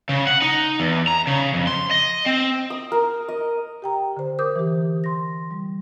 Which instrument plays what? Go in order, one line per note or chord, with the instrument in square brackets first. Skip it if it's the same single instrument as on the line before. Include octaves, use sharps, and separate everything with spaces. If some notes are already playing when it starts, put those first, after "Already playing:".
[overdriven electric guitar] C#3
F#5
D#4
E2
A#5
C#3
F2
C6
D#5
C4
[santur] D#6
A#4
D#5
[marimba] G4 G5 A#5
D3 C5
A#4 C5 D6 D#6 G6
E3 G4
C6 A#6
G3